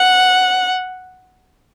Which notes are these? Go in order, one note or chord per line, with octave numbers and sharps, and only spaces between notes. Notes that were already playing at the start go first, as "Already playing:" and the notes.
Already playing: F#5